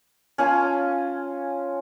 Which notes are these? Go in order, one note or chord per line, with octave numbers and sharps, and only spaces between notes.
C#4 F4 G#5 A5